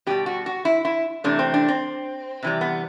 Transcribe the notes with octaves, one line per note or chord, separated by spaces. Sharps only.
B2 G3 G4
F#4
F#4
E4
E4
C3 E3 A3 D4
C4
D4
C4
C3 E3 G3
B3